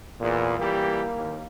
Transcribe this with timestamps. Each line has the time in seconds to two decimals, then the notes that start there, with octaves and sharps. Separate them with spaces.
0.20 E2 A#2
0.58 E3 G3 A#3 G4
1.16 D#2